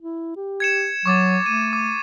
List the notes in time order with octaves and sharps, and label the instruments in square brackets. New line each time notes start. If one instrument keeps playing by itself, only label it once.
[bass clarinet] E4
G4
[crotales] G#6 C#7 E7
[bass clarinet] F#3 [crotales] C#6 D6 A6
[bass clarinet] A3 [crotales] D#7
[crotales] D6